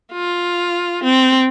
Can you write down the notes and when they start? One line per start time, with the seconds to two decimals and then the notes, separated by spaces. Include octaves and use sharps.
0.12 F4
1.04 C4